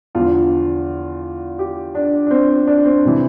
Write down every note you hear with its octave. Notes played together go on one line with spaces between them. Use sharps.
E2 D3 F3 F4
G4
D4
D4
C4
D4
C4
C3 E3